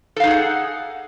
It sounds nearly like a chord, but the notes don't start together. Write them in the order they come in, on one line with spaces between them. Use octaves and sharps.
A4 F5 D#4 G#4 F#5